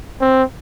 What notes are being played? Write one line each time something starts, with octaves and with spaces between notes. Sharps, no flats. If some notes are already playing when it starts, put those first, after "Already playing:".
C4